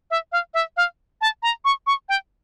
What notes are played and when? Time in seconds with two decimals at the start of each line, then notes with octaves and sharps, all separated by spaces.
0.11 E5
0.32 F5
0.54 E5
0.77 F5
1.21 A5
1.43 A#5
1.65 C#6
1.87 C#6
2.09 G5